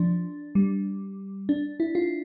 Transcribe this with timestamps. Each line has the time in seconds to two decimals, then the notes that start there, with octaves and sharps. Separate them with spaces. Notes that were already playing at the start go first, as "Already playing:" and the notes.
Already playing: F3 D4
0.55 G3
1.49 D4
1.80 E4
1.95 F4